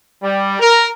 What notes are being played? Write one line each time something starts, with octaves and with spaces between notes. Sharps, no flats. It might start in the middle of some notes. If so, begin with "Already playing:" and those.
G3
A#4